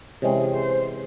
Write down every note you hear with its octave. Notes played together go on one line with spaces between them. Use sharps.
C3 E3 G#3 C#4 G#4
C5